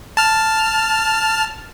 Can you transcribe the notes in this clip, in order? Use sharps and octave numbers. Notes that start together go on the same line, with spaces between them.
A5 F6